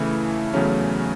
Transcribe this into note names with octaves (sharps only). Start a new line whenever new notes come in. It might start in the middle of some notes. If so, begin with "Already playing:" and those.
Already playing: C#3 E3 A3 E4
E2 C#3 F#3 A3 C#4